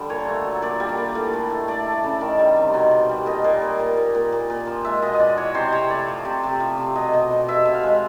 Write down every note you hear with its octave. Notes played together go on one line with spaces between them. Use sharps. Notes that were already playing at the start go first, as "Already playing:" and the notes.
Already playing: D3 G3
A#2 C#5
A3
F#3
A#2 D5
G3
D5
A#2
A2
A2
A3
A3 D5
A3
C#3
D#3
G3
C3
B2
B2
G3
A#2 D#5
A#2
A#2
A#2
A#2
A#2
A#2
A#2
F3
G#3 E5
B2 D#5
D#5
G#3 D5
E3 C#5
C3 C5
C3 C#5
A3 D5
F3
C3
C3
F3
C3
B2 D#5
B2
B2
B2 E5
B2
F5
G#3